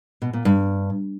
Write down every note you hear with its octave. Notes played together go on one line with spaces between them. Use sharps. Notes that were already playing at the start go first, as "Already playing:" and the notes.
B2
A#2
G2